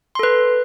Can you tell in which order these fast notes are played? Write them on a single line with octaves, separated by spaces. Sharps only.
C6 A4 B4